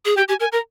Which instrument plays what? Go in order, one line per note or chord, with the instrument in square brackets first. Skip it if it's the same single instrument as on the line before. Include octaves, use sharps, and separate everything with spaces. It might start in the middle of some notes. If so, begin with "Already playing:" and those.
[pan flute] G#4
[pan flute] G4 [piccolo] G5
[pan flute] G4 [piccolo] G#5
[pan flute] A#4 [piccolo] G#5
[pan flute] A#4 [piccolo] A#5